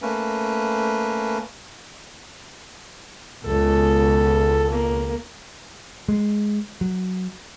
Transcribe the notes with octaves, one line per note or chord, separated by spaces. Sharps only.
A3 A#3 C#4 B4
C#2 B2 A4
A#3
G#3
F#3